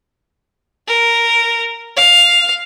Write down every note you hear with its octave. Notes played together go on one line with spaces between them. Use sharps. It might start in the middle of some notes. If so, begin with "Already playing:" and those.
A#4
F5